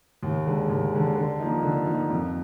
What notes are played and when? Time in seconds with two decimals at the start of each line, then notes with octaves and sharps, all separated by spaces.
0.23 D#2
0.46 D3 G#3
0.70 D#2
0.92 D3 G#3
1.16 D3
1.39 F3 A#3 D#4
1.62 D3
1.86 F3 A#3 D#4
2.10 F2